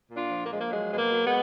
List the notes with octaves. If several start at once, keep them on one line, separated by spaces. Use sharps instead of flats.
A#2
D4 F4
F3
A#3
F3 G#3
A#3
F#3 G#3
B2 G#3
A#3
F#3
G#3 B3